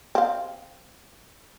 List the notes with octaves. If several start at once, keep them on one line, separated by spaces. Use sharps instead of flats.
C4 F5